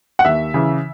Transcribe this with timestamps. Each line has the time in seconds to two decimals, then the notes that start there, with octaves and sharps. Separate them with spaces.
0.19 F#5
0.25 D#2 E5
0.54 C#3 E3